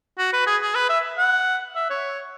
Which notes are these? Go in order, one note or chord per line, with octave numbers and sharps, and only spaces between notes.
F#4
B4
G#4
G#4
B4
E5
F#5
E5
C#5